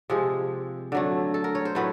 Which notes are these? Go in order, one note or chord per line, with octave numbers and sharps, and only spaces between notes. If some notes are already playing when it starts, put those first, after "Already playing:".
C3 F3 G#3 G#4
D3 F#3 A3
A4
A#4
C#5
C5
A2 F#3 A3 B4